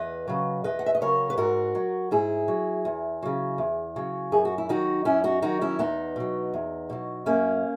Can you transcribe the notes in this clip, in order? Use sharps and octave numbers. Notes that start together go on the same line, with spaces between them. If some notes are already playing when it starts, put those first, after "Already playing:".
Already playing: E2 B4 D#5
C#3 F#3
E2 B4 D#5
F#5
E5
D#5
C#3 F#3 A#4 C#5
B4
G#2 F#4 A#4
F#3
G#2 E4 G#4
F#3
E2
C#3 F#3
E2
C#3 F#3
F#2 G#4
F#4
E4
D#3 F#3 D#4 F#4
F#2 C#4 E4
D#4 F#4
D#3 F#3 D#4 F#4
C#4 E4
E2 B3 D#4
B2 F#3
E2
B2 F#3
F#2 A#3 C#4